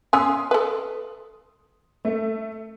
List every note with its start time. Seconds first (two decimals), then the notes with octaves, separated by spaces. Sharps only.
0.13 C#4 G#5 C6 D#6
0.51 A4 B4
2.05 A3